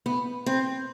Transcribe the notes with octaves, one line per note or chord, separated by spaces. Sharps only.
B3
C4